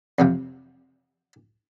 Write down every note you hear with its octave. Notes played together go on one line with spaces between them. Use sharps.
F2 C3 F3